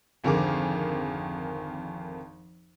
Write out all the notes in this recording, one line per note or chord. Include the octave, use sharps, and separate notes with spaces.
G#1 F2 D3 D#3 G#4 D6